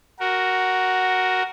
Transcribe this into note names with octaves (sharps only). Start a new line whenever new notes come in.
F#4 A#4